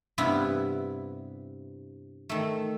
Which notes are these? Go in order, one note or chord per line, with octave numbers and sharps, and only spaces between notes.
G2 C3 B3 E4
D#3 A3